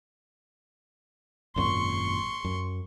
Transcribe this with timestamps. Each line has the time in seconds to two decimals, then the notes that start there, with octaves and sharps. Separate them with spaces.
1.56 G#1 F#2 A#2 C6 C#6
2.45 F#2